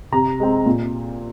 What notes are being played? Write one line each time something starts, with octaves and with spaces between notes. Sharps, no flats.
C3 A#5
G#3 C4
A#2